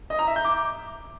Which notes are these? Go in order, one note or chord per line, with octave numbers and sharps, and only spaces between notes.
D#5
A#5
E5
G6
D6